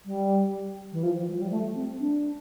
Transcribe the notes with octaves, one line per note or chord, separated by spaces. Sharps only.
G3
E3
F3
G3
F3
G3
A3
C4
D4